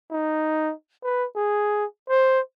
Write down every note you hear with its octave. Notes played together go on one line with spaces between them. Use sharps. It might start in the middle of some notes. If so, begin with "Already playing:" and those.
D#4
B4
G#4
C5